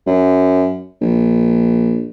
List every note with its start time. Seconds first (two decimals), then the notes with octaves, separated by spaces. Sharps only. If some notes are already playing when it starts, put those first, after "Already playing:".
0.07 F#2
1.01 A#1